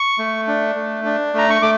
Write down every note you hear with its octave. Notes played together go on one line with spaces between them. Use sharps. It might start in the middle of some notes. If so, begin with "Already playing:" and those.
Already playing: C#6
A3
D4
A3
D4
A3 A#5
C#6
A3 D6